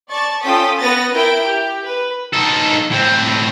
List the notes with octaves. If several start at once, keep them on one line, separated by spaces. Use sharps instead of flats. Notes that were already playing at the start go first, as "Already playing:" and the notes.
D5 A5 C#6 A6
C#4 F4 A4 G5 D#6 B6
B3 B4 F#5 D#6 A6 A#6
E4 A#4 G5 G6 D7
G4
B4
D#4 A4
A2 C4